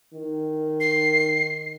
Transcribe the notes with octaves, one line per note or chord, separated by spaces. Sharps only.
D#3
C7